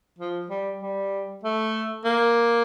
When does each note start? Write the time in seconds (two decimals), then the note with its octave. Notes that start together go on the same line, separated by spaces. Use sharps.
0.19 F3
0.50 G3
0.82 G3
1.43 A3
2.05 A#3